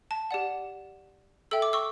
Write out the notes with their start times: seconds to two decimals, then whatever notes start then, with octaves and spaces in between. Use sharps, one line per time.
0.11 A5
0.31 G4 D5 F#5
1.51 A4 E5 G5 E6
1.62 D6
1.73 C#6 E6